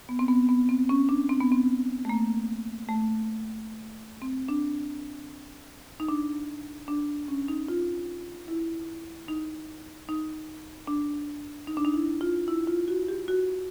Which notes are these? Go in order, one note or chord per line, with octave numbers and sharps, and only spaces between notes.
B3
C4
B3
B3
C4
C#4
D4
C4
B3
C4
A3
A#3
A3
C4
D4
D#4
D4
D4
C#4
D#4
F4
E4
D#4
D#4
D4
D#4
D4
D#4
E4
F4
E4
F4
F#4
G4
F#4